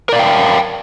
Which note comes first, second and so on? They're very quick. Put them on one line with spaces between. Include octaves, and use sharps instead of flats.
A#4 D5 F5 G5